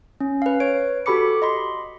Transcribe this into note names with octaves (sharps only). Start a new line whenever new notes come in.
C#4
B4 F5
B4 C#5 D7
F#4 G4 A4 B5 D6 C#7
D#5 B5 C6